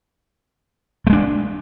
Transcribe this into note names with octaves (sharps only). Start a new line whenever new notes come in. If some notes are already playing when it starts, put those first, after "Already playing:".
G#3 A3 D4